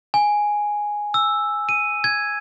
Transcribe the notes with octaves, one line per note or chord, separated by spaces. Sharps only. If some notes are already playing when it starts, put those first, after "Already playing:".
G#5
E6
D#7
G#6